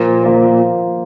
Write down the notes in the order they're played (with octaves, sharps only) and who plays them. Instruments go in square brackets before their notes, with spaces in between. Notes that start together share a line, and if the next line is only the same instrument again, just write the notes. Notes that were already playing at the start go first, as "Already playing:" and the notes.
Already playing: [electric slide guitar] A#2 [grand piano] F3 A#3 F4 C5
[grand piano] F3 A#3 F4 C5